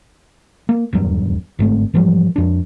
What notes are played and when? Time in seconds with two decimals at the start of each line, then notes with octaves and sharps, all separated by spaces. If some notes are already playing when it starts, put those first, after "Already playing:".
0.69 A#3
0.93 D#1 E2 G2 F#3
1.59 G1 G#2 A3 C4
1.94 G#2 E3 F3 G3
2.36 F2 D4